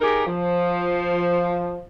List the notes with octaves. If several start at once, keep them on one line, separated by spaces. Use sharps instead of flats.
D#4 G4 G#4 A#4
F3